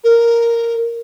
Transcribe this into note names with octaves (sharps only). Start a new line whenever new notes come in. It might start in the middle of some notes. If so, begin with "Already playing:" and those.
A#4